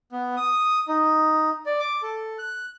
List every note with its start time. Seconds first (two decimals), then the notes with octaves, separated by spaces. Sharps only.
0.12 B3
0.37 D#6
0.88 D#4
1.66 D5
1.80 D6
2.02 A4
2.39 F#6